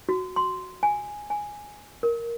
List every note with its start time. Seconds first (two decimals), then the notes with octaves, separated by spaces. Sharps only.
0.09 F#4
0.36 C6
0.83 G#5
1.30 G#5
2.03 A#4